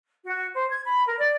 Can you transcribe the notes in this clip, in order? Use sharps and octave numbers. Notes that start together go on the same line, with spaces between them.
F#4
C5
G#6
B5
A#4
D5